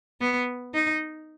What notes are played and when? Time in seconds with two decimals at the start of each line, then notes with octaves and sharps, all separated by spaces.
0.21 B3
0.74 D#4